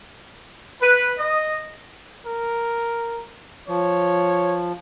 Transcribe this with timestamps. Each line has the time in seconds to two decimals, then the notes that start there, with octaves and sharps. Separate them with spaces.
0.81 B4
1.18 D#5
2.26 A#4
3.68 F3 C#5